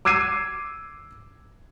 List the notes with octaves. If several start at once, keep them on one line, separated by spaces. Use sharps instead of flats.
D6 E6 G#6 C7 D#7